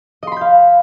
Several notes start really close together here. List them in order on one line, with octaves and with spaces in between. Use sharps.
D#5 C6 B5 G6 F5